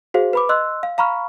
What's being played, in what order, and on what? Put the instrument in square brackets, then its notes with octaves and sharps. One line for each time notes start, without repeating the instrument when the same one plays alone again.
[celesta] F#4 G#4 C5 F5
B4 B5 D6
D#5 C6 E6 F#6
F5
F5 A#5 B5 C#6 F6